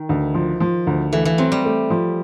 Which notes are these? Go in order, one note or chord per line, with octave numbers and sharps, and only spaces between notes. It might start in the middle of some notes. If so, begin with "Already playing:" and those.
Already playing: D#3
D2
F3
F3
D2
E3 A3
E3
F#3 C4
G3
A3
F3